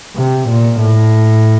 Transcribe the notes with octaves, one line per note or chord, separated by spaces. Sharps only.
C3
A#2
A2